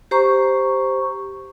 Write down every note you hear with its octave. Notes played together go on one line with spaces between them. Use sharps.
G4 C5 A#5 C#6